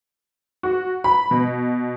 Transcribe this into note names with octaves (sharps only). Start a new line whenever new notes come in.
F#4
B5
B2